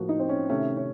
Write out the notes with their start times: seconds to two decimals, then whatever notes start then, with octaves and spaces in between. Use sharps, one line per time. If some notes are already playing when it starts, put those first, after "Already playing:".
Already playing: A2 F3 A#3 F#4
0.09 D#4
0.19 C4
0.29 C#4
0.49 C3 D#3 A3 C#4
0.77 C#4